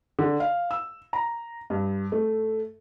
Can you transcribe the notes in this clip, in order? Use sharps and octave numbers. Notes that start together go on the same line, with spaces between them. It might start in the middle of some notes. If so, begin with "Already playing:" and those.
D3
F5
E6
A#5
G2
A3